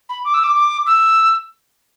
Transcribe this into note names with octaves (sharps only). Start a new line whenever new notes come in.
B5
D6
E6
D6
D6
E6